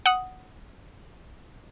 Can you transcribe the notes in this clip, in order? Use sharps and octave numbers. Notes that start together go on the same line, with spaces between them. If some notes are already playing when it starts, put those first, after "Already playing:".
F#5 D#6